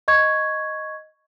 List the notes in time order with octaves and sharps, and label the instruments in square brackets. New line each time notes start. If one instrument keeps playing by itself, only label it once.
[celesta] D#5 C#6 G#6